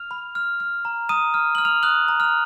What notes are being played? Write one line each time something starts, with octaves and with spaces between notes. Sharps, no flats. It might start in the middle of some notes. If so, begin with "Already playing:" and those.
Already playing: F6 F7
B5
F6
F6
A#5
A#5 D#6 D#7
F6
F6 F#7
F6 F7
D#6 F#6 F#7
A#5
F6 F7